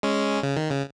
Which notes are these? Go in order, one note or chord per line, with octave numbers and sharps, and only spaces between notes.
G#3 C#4
C#3
D#3
C#3